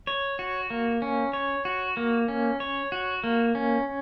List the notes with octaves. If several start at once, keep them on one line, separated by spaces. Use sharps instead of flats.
C#5
F#4
A#3
C#4
C#5
F#4
A#3
C#4
C#5
F#4
A#3
C#4